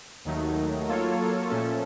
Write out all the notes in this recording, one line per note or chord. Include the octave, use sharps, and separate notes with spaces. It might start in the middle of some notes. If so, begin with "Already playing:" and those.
D#2 D#3 F#3 A3 D#4
F#3 A#3 F4 A4 C#5
A#2 F3 A3 C#4 A4